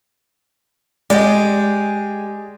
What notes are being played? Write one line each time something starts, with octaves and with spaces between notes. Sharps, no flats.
G#3 G4 G#4 D5 D#5